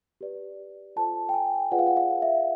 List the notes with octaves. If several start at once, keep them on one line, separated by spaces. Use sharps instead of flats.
G4 B4 D5
F4 A4 C5 A5
G5
G#5
F4 G#4 B4 D5 F#5
F5
F#5
F5
E5